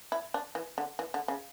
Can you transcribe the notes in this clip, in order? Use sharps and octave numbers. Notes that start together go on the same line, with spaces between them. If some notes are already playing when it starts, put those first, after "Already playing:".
E4
D4
E3
D3
E3
D3
C#3